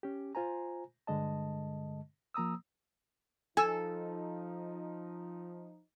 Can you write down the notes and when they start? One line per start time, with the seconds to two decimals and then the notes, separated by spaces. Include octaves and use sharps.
0.03 C#4 G4
0.35 F4 C5 G#5 A#5
1.07 G2 D3 G#3 D#5 A5
2.34 F3 A#3 A#5 D#6 E6
3.57 F3 D#4 A4 G#5 E6